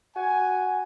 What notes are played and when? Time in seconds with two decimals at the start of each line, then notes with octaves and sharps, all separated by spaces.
0.16 F#4 G#5